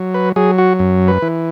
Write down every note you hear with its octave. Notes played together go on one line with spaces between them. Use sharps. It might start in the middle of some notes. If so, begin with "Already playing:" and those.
Already playing: F#3
B4
F#3 G#4
F#4
F#2
B4
E3